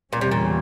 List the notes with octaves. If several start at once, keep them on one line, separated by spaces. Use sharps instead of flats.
E2 A#2 C#3 G3 A#3 C#4
C3
A#2